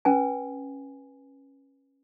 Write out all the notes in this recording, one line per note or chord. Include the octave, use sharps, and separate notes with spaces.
C#4 B4 G#5